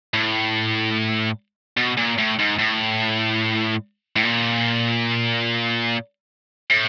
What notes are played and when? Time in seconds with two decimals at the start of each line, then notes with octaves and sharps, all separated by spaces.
0.14 A2
1.77 B2
1.98 A#2
2.19 A2
2.39 G#2
2.59 A2
4.16 A2
4.24 A#2
6.70 A2